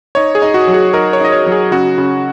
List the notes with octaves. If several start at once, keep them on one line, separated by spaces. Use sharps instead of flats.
D#4 C#5
G#4
D#4
F#4
F#3
G#4
D#4 A#4
C#5
D#4 D#5
C#5
F#3
G#4
C#3 F#4
C#3